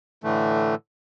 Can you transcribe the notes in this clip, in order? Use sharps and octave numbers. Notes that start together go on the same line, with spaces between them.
A2 D3 E3 A3